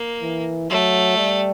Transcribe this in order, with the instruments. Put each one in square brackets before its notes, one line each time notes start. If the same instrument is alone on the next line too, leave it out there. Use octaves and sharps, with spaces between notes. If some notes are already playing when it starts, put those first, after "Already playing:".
Already playing: [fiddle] A#3
[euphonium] E3
[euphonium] F#3 [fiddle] A3
[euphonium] G3